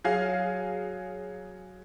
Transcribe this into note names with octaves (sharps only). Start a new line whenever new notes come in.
F#3 G#4 F5